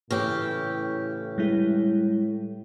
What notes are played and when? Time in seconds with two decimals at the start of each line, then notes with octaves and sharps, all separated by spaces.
0.10 A2 C#3 E3 G4
1.38 G3 G#3 E4